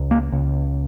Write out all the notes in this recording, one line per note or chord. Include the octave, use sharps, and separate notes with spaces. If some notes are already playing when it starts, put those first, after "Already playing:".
Already playing: C#2
A#3
C#2